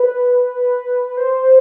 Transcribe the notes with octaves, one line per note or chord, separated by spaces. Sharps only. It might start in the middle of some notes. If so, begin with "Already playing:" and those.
Already playing: B4
C5